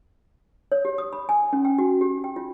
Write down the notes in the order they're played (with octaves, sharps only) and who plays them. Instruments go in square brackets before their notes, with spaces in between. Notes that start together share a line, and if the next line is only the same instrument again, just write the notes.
[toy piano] C#5
G4
D#6
B5
G#5
C#4
G5
F#4
G4
G5
F4